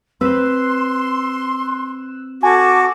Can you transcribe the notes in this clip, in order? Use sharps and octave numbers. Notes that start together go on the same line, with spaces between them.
C4 B4 C6 E6 F#6 E7
F#4 A4 G#5 A5 D6 G#6